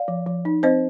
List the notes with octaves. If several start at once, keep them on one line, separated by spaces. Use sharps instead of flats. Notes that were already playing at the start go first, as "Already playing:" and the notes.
Already playing: D5 F5
F3
F3
D#4
C4 C5 D#5